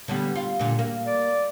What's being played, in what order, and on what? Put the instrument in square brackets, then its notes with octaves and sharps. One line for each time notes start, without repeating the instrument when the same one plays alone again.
[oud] D3 G3 B3
F4
A#2 D3
A#3
[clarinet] D5